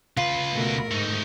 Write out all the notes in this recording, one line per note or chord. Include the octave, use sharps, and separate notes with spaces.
C#2 F4 B4
B2 A3 A#4
G#2 A3 D#4